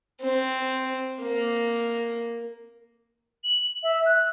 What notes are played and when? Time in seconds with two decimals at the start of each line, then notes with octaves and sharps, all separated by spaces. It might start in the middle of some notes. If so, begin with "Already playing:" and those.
0.21 C4
1.22 A#3
3.44 F#7
3.83 E5
4.06 F#6